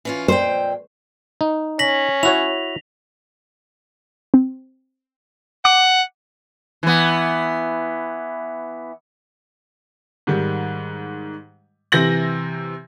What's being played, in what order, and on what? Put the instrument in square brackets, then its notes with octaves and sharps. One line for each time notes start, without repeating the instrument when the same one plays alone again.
[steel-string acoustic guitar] E3 C#4 F4
[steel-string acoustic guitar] F2 A#2 G5 [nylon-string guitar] C5
[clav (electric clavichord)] D#4
[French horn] C#4 [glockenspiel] A#6 B6 F#7
[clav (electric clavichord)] E4 F#4 C#5 [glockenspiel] F7
[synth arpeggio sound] C4
[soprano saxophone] F#5 [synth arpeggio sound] D6
[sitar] E3 B3
[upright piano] G#2 D#3 G3
C3 E3 G6 A#6 F#7